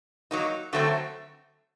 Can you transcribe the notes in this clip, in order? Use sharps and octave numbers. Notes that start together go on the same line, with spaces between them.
F#3 A#3 D#4
D3 F#3 A3 C4